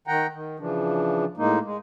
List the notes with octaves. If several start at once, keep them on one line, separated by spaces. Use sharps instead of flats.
D#3 F#5 G5 A#5
D#3
C#3 E3 F3 D4
A2 G#3 A#3 D#4
G#3